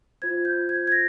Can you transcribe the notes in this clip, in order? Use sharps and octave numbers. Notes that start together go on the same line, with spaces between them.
F4 C5 G#6
G6
G#6
G#6
A#6